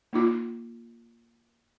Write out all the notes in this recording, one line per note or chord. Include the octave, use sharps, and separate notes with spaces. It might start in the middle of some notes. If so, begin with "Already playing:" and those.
A#3 D#4 F4